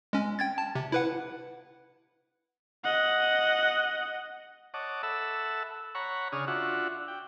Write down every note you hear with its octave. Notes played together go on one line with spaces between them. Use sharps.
G#3 C#4
G5 G#6 A6
A5
C3
E4 B4 F#5
D#5 F#5
C#5 D#5 F#5 A5 D6
A4 E5 F#5 A5 B5 E6
C#5 F#5 A#5 B5 C#6
C#3 D4 G#4 C#6 D#6 F6
D4 F4 F#4 E5 F#5
G5